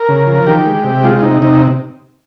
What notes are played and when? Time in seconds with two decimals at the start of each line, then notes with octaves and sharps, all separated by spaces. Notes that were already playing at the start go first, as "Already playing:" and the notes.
Already playing: A#4
0.08 C#3
0.27 F3
0.47 D#3 G4
0.66 G#3
0.84 C3
1.03 G#3 F4
1.19 F4
1.22 C3 D#4
1.42 C3 D#4